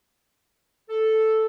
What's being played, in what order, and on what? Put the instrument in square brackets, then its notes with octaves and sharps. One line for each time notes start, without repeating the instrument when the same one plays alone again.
[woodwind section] A4